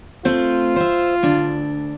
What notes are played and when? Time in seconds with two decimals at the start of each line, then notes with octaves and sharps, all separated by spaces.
0.25 A3 C4 F4 C5
0.76 C5 E5
1.23 D2 D4